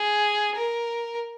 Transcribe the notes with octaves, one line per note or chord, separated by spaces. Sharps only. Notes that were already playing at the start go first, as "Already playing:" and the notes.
Already playing: G#4
A#4